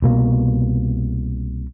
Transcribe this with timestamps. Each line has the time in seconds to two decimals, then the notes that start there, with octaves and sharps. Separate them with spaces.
0.02 C2 B2 A#3